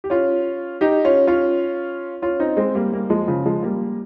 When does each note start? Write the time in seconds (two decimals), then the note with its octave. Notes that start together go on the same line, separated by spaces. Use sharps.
0.04 G4
0.10 C#4 F4
0.81 D#4 G4
1.05 C#4 F4
1.27 C#4 F4
2.22 C#4 F4
2.40 C4 D#4
2.57 G#3 C4
2.75 G3 A#3
2.93 G3 A#3
3.10 F3 G#3
3.28 C#3 F3
3.46 F3 G#3
3.63 G3 A#3